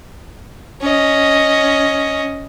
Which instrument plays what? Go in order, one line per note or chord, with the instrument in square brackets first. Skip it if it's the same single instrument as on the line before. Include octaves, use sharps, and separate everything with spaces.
[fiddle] C#4 D#5